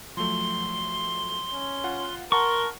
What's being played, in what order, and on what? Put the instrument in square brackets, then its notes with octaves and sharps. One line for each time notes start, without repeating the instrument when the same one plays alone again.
[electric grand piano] F3 F#3 A3 [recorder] C6
[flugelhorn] C#4
[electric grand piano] F4 F5 F#5
[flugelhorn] A#4 [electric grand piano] F#5 A5 A#5 [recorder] C6 [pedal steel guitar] C#6